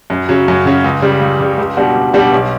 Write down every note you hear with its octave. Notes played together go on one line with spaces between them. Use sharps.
F#2
C#3 F#3 C#4
F#2
C#3 F#3 C#4
C#2
C#3 G3
C#2
C#3 G3
C#2
B2 G3 D4 F#4
C#2
B2 G3 D4 F#4
B1